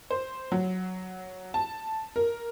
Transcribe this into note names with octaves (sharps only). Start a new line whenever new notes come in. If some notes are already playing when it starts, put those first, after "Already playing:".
C5
F#3
A5
A#4